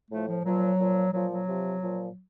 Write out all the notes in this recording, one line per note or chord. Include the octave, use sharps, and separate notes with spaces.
A2 F3 A3
F3
A#2 F3 F#3
A#2 F3
A#2 F3 F#3
F#3
C3 F3
A#2 F3